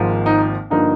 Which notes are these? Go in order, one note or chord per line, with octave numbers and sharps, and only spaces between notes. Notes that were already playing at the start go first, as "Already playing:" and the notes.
Already playing: G#1 G#2 F3 A#3
D#4
G2 D3 F3 A#3 D#4